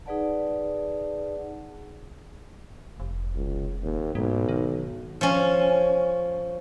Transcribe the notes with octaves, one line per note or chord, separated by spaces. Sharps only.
D#4 G#4 B4 D5 F#5 A5
F1
C#2
D#2
B1 G#2
D#3
F3 C#4